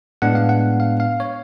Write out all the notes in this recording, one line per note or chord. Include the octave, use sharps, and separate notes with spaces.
A2 G#3 B3 D4 F#5
F5
F#5
F5
F5
C#5